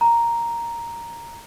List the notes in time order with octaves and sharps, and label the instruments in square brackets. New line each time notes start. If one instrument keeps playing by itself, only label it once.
[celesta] A#5